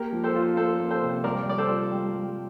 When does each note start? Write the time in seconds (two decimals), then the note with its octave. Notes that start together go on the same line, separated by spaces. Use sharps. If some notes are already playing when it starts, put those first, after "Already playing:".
Already playing: A#3 G4 A#4
0.13 F3
0.24 A4 C5
0.35 F4
0.57 A#3 A4 C5
0.79 A#3
0.91 A4 C5
1.02 C3
1.24 G3 A#4 D5
1.46 G3 D5
1.58 A4 C5
1.69 F4
1.91 G3
2.14 G3